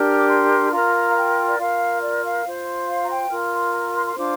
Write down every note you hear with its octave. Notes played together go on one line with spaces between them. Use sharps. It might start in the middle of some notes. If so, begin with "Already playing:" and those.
Already playing: D4 G4 A#4
F6
D6
C6
F4 A#4 A#5
F5
G5
D5
F4 A#4 F5
D5
F5
F4 C5
F5
A#5
G5
F4 A#4 F6
C6
A#5
C6
C6
D4 F4 C5 D6